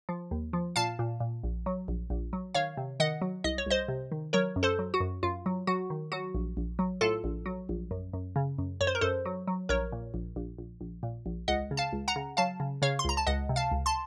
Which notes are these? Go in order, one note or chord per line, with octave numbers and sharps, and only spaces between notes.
F3
D#2
F3
A#2 F5 A5
A#2
A#2
A#1
F#3
A#1
A#1
F#3
D#3 C#5 F5
C3
D#3 D#5 F#5
F#3
C2 D#5
C#5
C2 C5 D#5
C3
D#3
F#3 A#4 C#5
F#2
A4 C5
F#3
F#4
F#2
F#2 F4
F#3
F#3 F#4
D#3
F#3 F#4
A#1
A#1
F#3
A2 F4 A4
A#1
F#3
A#1
F#2
F#2
C#3
F#2
F#2 C#5
C5
A#4
F#2 A4 C5
F#3
F#3
A#1 A#4 C#5
A#2
A#1
A#1
A#1
A#1
A#2
A#1
C#2 D#5 F#5
C#3
F5 A5
C#2
F#5 A#5
C#3
F#3 F5 A5
C#3
C#3 C#5 F5
C6
C#2 A#5
A5
C#2 D#5 F#5
C3
F5 A5
C#2
A5 C6